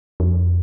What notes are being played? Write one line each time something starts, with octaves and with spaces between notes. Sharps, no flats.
F2